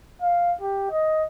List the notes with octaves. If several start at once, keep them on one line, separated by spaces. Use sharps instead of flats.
F5
G4
D#5